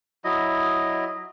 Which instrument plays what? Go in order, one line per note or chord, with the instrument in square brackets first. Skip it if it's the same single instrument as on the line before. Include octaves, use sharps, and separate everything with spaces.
[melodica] F#3 E4 D#5